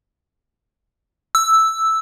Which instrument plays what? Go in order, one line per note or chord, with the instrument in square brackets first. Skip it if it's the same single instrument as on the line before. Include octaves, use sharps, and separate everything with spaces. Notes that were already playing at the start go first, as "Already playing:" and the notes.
[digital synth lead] E6